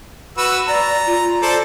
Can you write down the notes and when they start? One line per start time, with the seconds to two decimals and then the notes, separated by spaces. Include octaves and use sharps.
0.38 F#4 B4 E6
0.68 D5 A#5
1.06 F4
1.42 A4 C5 D5